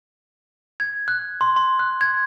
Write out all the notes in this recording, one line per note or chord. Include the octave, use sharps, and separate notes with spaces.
G#6
F#6
C6
C6
F#6
G#6